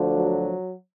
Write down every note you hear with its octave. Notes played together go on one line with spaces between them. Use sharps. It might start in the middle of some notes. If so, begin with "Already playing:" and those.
Already playing: D2 D3 F3
F#3